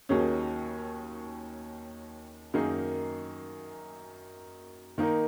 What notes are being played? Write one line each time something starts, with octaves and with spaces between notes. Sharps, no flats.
D#2 D#3 F#3 C#4 G#4
F#2 D#3 A#3 D#4 G#4
D#3 A#3 D#4 A#4